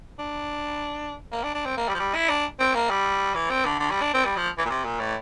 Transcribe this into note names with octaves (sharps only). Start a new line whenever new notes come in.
D4
A#3
D4
D4
C4
A#3
G3
F3
G3
E4
D4
C4
A#3
G3
E3
C4
D3
D3
G3
D4
C4
G3
F3
E3
A#2
C3
A#2
A2